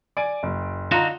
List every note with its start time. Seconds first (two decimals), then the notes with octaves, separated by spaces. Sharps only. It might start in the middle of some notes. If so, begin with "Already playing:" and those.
0.17 D5 G#5 D7
0.43 F#1
0.91 D3 D#4 F4 F#4 A#5